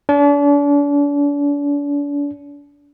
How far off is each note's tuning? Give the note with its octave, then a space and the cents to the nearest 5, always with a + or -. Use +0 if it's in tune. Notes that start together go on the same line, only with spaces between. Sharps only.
D4 -40